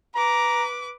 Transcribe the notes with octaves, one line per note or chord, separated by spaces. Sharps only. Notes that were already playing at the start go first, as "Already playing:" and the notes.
B4 A#5 D6